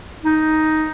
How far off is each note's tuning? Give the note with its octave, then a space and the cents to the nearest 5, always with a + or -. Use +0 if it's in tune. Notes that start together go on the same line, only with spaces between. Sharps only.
D#4 +5